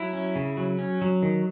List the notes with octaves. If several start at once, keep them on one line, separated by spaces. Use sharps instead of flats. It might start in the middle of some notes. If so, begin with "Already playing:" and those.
Already playing: F#3 E4
C#4
C#3
F#3
C#4
F#3
D#3